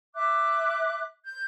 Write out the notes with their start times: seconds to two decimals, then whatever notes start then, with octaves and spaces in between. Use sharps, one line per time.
0.14 E5 D6 F#6
1.24 G6